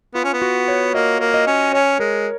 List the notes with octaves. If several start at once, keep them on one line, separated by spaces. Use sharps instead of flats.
B3 F4
C#4
B3
F#4
C#5
A#3 D#5
A#3
D#5
C#4
C#4 C#5
G#3 A#4